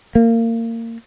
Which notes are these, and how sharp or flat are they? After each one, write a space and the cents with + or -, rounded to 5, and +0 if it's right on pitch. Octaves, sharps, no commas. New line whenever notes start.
A#3 -25